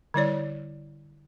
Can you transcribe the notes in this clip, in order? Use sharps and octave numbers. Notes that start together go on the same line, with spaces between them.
D3 G3 E4 C#5 D5